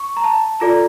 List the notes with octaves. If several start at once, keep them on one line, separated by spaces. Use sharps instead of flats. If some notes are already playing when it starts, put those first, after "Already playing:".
Already playing: C#6
A#5
A5
F4 A4 D5 A#5